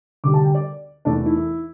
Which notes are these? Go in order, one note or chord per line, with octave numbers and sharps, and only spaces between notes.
D2 D3 G3 D6
A5
G5
D5
E2 E3 A3 D4
E4